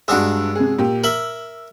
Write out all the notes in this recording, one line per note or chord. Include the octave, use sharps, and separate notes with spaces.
G2 G#3 D4 F#4 E6
C3 G#4
A#2 G4
A#4 E5 F#7